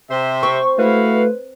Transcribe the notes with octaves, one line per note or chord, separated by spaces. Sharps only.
C3 C5 E5
C4 C#6
A3 E4 F#4 B4 F5